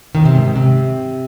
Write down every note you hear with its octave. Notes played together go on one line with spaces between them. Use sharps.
D#2 D#3
C3
G#2
G#2
C3